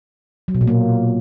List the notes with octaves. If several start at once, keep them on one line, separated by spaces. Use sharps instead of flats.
F#3
B2
A#2
A#3